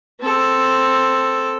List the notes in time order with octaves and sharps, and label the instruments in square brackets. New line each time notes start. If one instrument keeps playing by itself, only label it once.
[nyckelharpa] C4 A4